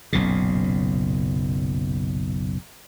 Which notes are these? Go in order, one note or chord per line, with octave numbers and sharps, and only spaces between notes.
F#1 B1 A#2 C#3